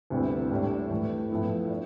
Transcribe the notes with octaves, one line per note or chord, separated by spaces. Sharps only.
D2 C3 G3 B3 E4
A2 G3 D4
A2 E3 A3
A2 F3 B3 E4
D4